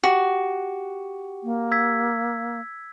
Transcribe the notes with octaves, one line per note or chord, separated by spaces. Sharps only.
F#4 G4
A#3
E6 G#6 B6